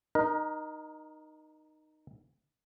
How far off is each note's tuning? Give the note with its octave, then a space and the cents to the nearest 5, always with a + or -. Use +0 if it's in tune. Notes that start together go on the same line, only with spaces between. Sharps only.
D#4 -10 A#4 +25